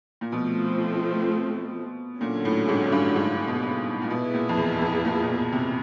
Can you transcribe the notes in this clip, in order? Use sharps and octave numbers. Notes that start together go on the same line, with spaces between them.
A#2
B2 F3 A3 C4
A#2 D3 F#3 A3 C#4
A2
G#2
G2
G#2
B2
A#2
B2 B3 E4 G#4
A#2
F2
E2
F2
A#2
A#2
B2
C3